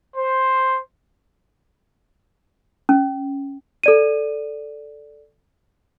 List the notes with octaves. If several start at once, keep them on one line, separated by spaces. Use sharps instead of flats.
C5
C#4
A4 D5 D#7